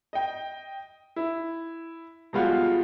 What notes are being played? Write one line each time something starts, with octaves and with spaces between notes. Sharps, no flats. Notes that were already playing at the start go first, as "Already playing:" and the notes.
D#5 G5
E4
B2 F3 G3 G#3 F4 F#4